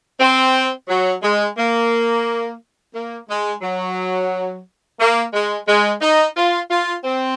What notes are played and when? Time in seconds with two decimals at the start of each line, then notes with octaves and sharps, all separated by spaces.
0.20 C4
0.88 F#3
1.22 G#3
1.57 A#3
2.93 A#3
3.28 G#3
3.62 F#3
4.98 A#3
5.33 G#3
5.67 G#3
6.01 D#4
6.36 F4
6.70 F4
7.04 C4